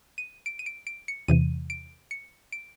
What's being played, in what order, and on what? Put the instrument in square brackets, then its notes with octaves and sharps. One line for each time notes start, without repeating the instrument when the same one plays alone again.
[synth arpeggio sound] D#7
D7
D#7
D7
D7
C#7
E2 C3 E3 D#7
D7
C#7
D7